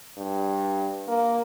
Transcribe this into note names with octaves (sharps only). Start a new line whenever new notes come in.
G2
A#3